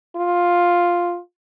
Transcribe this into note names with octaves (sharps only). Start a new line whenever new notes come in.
F4